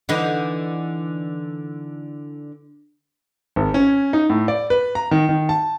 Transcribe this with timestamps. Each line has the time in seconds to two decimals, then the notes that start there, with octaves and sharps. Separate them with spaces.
0.09 D3 E3 D#4
3.56 G#1
3.74 C#4
4.13 D#4
4.30 A2
4.48 D5
4.70 B4
4.95 A#5
5.11 D#3
5.29 D#3
5.49 A5